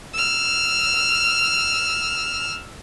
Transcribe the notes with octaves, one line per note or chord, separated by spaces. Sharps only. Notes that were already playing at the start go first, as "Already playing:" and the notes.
E6 F6